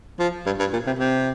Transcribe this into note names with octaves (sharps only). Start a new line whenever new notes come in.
F3
G2
G2
A#2
C3
C3